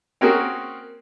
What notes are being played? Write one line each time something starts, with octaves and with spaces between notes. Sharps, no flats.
A#3 C4 C#4 F#4 G#4 A#4